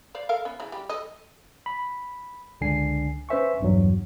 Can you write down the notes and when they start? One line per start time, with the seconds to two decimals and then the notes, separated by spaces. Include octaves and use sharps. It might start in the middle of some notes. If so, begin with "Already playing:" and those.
0.15 C5 D5 F5
0.29 A4 A#4 F5
0.45 B3 C#4
0.60 C#3 E3
0.72 G3 G4
0.89 A4 D#5
1.66 B5
2.61 G1 C#2 D3 D4 G#5 C7
3.29 C#4 B4 C5 E5 G#5 C#6
3.60 B1 E2 G2 E3 F#3